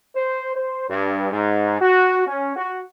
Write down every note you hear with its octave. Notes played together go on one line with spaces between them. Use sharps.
C5
C5
G2
G#2
F#4
C#4
F#4